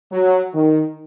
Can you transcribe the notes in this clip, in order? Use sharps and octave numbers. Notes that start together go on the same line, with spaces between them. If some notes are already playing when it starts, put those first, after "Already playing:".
F#3
D#3